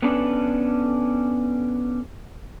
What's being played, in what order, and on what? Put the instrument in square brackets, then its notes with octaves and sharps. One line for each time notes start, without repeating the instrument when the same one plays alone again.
[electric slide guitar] B3 C#4 D4 A4 B4